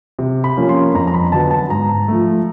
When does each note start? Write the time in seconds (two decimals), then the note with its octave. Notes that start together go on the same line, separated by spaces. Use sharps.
0.19 C3
0.44 B5
0.57 F3 A#3 C#4
0.69 C6
0.94 F2 A#5
1.07 A#5
1.14 B5
1.32 D3 F#3 B3 A5
1.51 A5
1.70 G#2 A#5
2.08 F3 A3